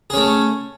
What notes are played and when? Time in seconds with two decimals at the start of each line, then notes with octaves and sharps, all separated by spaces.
0.10 G#4
0.14 C#4
0.17 A3